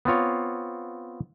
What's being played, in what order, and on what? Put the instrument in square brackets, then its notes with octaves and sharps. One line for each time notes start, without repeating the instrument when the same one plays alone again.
[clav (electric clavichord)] B3 C4 F4 C#5